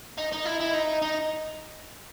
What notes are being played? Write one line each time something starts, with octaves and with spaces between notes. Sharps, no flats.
D#4
D#4
E4
E4
D#4
D#4